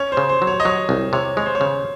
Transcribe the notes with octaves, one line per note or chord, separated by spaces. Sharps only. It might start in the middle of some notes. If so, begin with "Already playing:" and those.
Already playing: C#4 C#5
C5
C#3
C5
F#3
C#5
D#5
F#3 C#5
C2
C3 C#5
G#3 C#5
C5
C#5
C#3